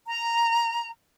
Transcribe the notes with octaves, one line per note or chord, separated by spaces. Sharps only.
A#5